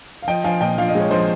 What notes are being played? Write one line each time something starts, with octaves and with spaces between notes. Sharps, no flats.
F5
F3 D#5 G5
F3 F5 G#5
A#2 D#5 G5
F3 F5
D#5
G#3 C#5
F3 C5 D#5